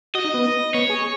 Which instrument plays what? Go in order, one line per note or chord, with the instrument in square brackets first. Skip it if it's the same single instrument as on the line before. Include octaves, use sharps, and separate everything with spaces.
[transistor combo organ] F#4 [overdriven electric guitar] D#5
[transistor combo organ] D#4
B3
[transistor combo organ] B3 [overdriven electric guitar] C#5
[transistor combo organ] G#4